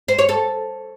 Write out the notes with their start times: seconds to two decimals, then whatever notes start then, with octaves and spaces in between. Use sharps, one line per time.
0.08 C5
0.19 C#5
0.29 A4